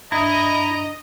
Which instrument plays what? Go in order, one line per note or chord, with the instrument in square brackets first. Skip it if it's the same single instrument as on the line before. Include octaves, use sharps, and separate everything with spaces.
[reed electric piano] G2 D4 D#6 [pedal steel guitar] E4 [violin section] D#5 [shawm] A#5